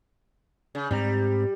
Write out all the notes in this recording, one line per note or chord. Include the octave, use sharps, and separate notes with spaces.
C#3
G#2 G3 C4 A#5